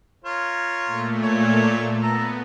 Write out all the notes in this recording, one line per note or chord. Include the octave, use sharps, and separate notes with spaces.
F4 A#4 C#5
A#2 A3
C#5
B3 A4 A#5